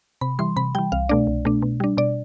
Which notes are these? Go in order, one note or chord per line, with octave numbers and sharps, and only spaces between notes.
C3 B5
E3 G3 C6
C3 B5
E3 G3 G5
C2 F5
B2 A3 D4 D5
C2
B2 A3 D4
B2
G3 D4
B2 D5